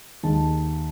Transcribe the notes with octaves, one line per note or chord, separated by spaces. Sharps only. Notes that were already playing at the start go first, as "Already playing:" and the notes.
D#2 D#3 G#3 A5